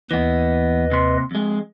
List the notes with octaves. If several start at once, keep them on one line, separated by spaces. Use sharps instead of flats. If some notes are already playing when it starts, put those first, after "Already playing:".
D#2 E3 B3 B4 D#5
C3 C6
F2 G#3